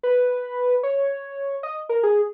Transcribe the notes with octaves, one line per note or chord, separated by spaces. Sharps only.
B4
C#5
D#5
A#4
G#4